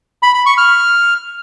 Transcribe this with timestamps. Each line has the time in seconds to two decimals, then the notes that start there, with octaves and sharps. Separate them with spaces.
0.23 B5
0.34 B5
0.46 C#6
0.58 F6